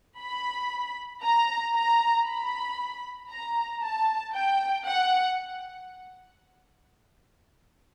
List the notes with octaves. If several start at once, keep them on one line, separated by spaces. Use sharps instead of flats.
B5
A#5
A#5
B5
A#5
A5
G5
F#5